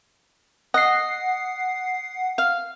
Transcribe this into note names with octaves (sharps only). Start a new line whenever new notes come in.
D#5 F#5 C7
F5